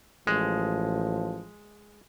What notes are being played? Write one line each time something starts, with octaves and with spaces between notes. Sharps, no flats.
A1 F3 G#3